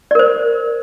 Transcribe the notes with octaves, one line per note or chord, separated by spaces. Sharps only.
A#4 C5 D5